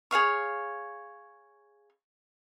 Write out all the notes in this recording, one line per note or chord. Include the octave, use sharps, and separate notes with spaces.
G#4 C#5 F5 C#6